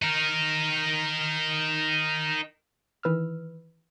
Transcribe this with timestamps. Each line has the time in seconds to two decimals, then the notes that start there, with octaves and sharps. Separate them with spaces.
0.02 D#4 A#4
3.03 D#3 E3 B4 E6 F6